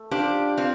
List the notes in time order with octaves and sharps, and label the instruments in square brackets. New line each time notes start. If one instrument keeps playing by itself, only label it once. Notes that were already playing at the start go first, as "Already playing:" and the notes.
Already playing: [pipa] A3
[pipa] F3 [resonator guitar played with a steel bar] D4 G4
[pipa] F3 [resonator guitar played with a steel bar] C4 F4